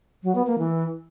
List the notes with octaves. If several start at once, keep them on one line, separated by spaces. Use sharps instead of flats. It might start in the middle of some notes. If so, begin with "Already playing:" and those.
F#3
B3
A#3
E3